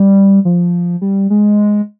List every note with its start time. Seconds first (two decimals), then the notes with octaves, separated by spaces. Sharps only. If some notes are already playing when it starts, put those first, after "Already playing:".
Already playing: G3
0.45 F3
1.02 G3
1.30 G#3